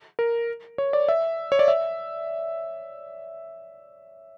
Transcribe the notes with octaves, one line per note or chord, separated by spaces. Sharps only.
A#4
C#5
D5
E5
C#5
D5
E5